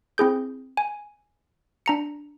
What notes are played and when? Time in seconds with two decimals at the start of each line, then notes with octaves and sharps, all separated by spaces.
0.18 C4 E4 G#4 G6
0.77 G#5
1.86 D4 A#5 C#7